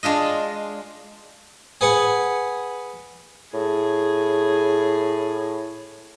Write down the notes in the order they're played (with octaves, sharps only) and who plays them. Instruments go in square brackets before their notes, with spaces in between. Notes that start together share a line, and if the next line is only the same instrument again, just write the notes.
[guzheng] G#3 D4 F4 D#5
[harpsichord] G#4 B4 F#5 G#5
[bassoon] A2 [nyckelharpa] G#4